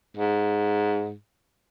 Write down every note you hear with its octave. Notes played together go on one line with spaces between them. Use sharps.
G#2